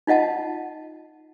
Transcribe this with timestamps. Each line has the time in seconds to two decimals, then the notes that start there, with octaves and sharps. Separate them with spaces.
0.07 D#4 F4 D#5 F#5 A5